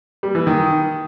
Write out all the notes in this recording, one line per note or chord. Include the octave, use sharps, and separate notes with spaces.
G3
E3
D#3